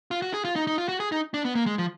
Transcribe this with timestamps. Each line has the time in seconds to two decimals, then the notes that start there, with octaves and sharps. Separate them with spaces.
0.11 F4
0.22 F#4
0.34 G#4
0.45 F4
0.56 D#4
0.67 D#4
0.78 F4
0.89 F#4
1.00 G#4
1.12 D#4
1.34 D4
1.45 B3
1.55 A#3
1.66 G#3
1.78 F3